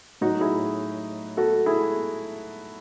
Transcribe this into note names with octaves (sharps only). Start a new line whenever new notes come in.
A2 F#3 D#4 F#4
E4 G#4
F#4 A4
E4 G#4